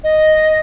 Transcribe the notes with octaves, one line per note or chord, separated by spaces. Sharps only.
D#5